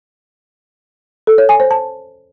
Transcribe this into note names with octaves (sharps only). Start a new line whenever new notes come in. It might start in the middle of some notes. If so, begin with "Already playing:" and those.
A4
C#5
G#5
C5
A5